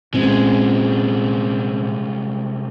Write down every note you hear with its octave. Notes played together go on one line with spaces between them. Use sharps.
C2 A#2 G#3 C4 C#4